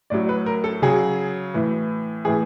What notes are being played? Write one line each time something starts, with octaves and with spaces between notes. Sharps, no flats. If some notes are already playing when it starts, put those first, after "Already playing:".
A2 F#3 D5
B4
A#4
A4
C#3 F#3 G#4
A2 E3
A2 E3 G#4